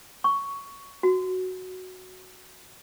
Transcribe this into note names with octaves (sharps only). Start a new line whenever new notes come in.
C#6
F#4